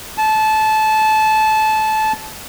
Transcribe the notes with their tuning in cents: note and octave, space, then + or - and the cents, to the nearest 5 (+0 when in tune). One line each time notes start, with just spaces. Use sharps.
A5 -20